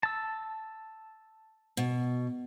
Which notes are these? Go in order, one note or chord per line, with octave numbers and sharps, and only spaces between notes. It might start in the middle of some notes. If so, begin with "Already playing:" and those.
A5 E6
B2